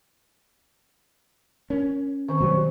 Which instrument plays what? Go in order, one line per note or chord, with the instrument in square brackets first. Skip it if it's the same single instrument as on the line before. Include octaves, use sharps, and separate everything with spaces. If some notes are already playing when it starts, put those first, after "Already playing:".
[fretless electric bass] C#4 [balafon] A#4
[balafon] D#3 C4 [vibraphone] C5 C#6
[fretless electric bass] B2 F#3 G3